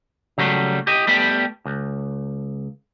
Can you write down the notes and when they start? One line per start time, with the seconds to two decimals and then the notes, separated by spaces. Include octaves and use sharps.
0.38 C#3 F#3 G3 A3
0.87 G4 D#5
1.07 G3 A3 B3 G4
1.65 C#2